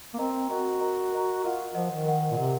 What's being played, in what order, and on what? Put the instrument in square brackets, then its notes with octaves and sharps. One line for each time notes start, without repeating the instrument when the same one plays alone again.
[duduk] A#3
[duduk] C4 [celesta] A#4 D#5 A#5
[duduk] F#4 [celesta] A#4 D#5 A#5
[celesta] A#4 D#5 A#5
A#4 D#5 A#5
[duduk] F4 [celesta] A#4 D#5 F#5
[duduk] F3 [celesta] A#4 D#5 F#5
[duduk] D#3
[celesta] A#4 D#5 F#5
[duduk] A#2
[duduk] C3 [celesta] A#4 D#5 F#5